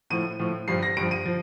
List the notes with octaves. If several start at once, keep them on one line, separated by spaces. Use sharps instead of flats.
A2 F3 D#7
A2 F3
G2 F3 C7
A#6
G2 F3 D7
D#7
F3